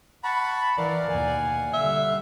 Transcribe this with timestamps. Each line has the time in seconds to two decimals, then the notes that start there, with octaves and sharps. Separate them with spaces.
0.24 F#5 A5 B5 C#6
0.78 E3 A#4 D5 F5 F#5
1.09 D#2 B2 G#5
1.73 D3 G3 E5